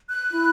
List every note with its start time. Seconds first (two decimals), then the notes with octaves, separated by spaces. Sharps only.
0.09 F#6
0.30 E4